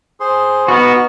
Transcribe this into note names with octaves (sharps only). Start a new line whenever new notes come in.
G#4 C5 C6
B3 D#4 F#4 C#6 F6